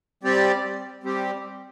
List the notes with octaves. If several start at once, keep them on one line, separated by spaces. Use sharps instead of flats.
G3 C4 G4 D5
G3 C4 G4